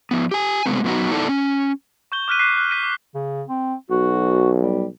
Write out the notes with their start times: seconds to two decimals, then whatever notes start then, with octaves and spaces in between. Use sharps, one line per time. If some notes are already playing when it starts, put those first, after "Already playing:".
0.11 F3 B3
0.31 G4 G#5
0.66 C3 G#3 A3 B3 C4
0.84 F#2 F#3 B3 D#4 F#4
1.11 B3 D#4 E4 A4 D5 F#5
1.29 C#4
2.12 C#6 G6 G7
2.28 D6 F6 F#6 B6 D#7
2.39 D6 F#6 B6 C7 D#7
2.57 F#6
2.71 F6 B6 D#7
2.84 D6
3.15 C#3
3.48 C4
3.91 B1 F#4
4.63 G3